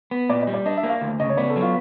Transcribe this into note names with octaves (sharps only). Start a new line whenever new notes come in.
B3
A#2 D5
D#5
G3
D5
D4 D#5
E5
A#3
F5
D2
C#3 D#5
C#5
B3 D5
A4
F#3
F4